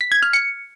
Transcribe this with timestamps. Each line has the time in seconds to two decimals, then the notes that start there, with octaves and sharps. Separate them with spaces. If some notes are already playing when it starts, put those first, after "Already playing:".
0.01 B6
0.12 G#6
0.22 F6
0.33 C#7